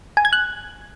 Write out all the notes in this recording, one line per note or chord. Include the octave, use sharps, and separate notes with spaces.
G#5
G#6
F#6